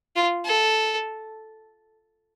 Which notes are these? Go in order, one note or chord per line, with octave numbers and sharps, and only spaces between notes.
F4
A4